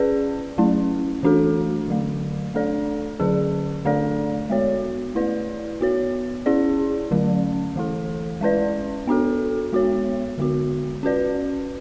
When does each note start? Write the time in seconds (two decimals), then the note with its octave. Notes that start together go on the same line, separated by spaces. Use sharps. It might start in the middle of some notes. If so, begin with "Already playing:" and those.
Already playing: C#4 G#4 B4 D5
0.58 F#3 A3 C#4 E4
1.23 E3 A3 D4 F#4 A4
1.88 D3 F#3 A3
2.54 A3 D4 A4 D5
3.19 D3 F#3 C#4 G#4
3.85 D3 A3 D4 A4 D5
4.50 G#3 B3 F#4 C#5
5.15 A3 E4 B4 D5
5.81 B3 F#4 C#5
6.46 C#4 E4 G#4 D5
7.11 D3 F#3 A3 C#4
7.76 E3 A3 E4 A4
8.41 G#3 C#4 E4 B4 D5
9.07 B3 D4 F#4 A4
9.72 G#3 B3 F#4 C#5
10.38 D3 G#3 B3 F#4
11.03 C#4 F#4 B4 D5